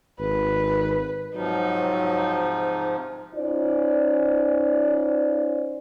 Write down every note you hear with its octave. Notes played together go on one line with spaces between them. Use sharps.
G#1 B4
G#2 C3 F3 F#3 D#4
C#4 D#4 F4 C5 D5